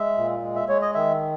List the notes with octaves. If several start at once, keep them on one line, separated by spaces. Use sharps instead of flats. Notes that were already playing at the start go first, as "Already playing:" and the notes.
Already playing: G#3 E5
A#2
G#3
E5
G#3 C#5
D#5
D#3 E5